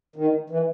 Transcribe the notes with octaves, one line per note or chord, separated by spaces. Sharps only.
D#3
E3